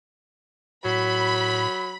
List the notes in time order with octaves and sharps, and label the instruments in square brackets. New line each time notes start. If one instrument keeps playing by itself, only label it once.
[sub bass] A2 [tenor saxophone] F#3 [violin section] B5